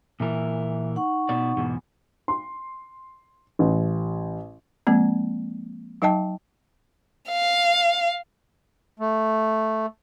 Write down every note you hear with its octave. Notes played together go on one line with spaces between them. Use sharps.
A#2 E3 A#4 E5
D#4 F#5 C#6
B2 D5
E2 G#2 B2
C6
A1
F3 G#3 A#3 C4
F#3 D#4 D#5 G5 A5
F5
A3